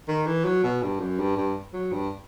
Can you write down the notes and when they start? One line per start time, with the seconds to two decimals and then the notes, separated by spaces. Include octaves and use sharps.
0.08 D#3
0.26 E3
0.45 F#3
0.64 B2
0.83 G2
1.00 F#2
1.19 G2
1.37 G2
1.74 F#3
1.92 G2